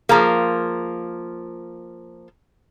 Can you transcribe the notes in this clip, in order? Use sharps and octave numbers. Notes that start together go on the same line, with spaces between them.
F3 A#3 G#4 A#5